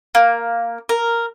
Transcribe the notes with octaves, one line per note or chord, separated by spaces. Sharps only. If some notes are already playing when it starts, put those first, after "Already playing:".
A#3
A#4